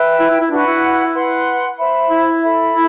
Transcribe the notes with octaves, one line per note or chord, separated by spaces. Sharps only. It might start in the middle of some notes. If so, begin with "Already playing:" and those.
Already playing: B4 E5 G5
E4
E4
E4
D4 F#4 B4 F#5
E4
B4 F#5 C6
C5 E5 B5
E4
A4 E5 B5
E4